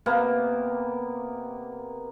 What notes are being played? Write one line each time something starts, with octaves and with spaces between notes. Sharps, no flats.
C3 A#3 B3